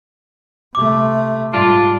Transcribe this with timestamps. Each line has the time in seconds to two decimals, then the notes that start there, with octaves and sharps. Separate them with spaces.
0.75 C3 A3 D6
1.52 G#2 G3 D4 F4